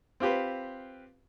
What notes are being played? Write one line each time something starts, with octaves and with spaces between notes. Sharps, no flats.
C4 F4 G4 B4